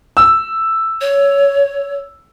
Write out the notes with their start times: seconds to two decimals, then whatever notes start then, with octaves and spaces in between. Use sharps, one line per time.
0.17 E6
1.01 C#5